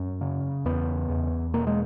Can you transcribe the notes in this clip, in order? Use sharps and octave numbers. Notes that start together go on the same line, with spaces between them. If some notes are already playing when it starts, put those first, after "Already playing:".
Already playing: F#2 C#4
C#3
E2 B3
E2
B2 A#3
G#3